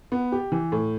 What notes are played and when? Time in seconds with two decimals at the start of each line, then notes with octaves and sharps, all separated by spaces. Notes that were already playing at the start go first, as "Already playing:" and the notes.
0.12 B3
0.32 G4
0.52 E3
0.72 A2